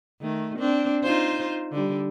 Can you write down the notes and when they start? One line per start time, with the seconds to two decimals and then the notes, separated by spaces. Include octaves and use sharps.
0.21 D#3 A3
0.59 C4 D4
1.04 D#4 F4 C5
1.72 D3 G3